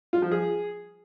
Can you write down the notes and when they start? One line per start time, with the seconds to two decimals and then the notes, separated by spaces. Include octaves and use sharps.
0.13 F4
0.22 F3
0.31 G#4